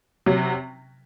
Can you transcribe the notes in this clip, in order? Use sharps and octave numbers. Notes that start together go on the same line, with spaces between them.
C3 F#3